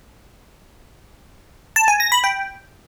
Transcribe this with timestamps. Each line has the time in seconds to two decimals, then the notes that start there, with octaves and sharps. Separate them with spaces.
1.76 A5
1.88 G#5
2.00 A#6
2.12 B5
2.24 G5